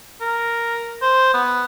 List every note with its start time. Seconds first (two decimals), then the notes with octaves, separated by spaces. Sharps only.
0.21 A#4
1.02 C5
1.34 B3